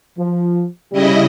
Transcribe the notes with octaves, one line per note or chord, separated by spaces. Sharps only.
F3
C#3 G3 E4 D#5